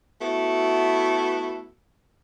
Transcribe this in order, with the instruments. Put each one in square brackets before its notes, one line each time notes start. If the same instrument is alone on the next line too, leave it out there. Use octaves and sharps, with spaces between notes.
[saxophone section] A3 B3 E4 F#4 A4